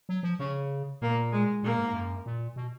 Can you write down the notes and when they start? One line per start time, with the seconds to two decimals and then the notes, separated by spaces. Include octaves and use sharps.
0.09 F#3
0.23 F3
0.39 C#3 C#4
1.02 A#2 A#3
1.32 G#3
1.63 A#2 A#3
1.79 G#2
1.94 F#2
2.26 A#2
2.56 B2